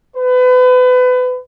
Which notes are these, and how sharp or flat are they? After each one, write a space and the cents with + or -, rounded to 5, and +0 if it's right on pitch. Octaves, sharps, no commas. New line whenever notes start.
B4 +30